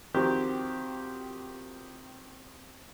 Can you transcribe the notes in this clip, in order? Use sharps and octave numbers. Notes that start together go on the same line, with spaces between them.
D#3 F3 C4 F#4 G4